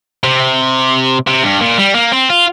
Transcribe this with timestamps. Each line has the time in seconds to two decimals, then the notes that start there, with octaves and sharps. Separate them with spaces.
0.24 C3
1.27 C3
1.43 G2
1.60 A#2
1.78 G3
1.95 A#3
2.12 C4
2.30 F4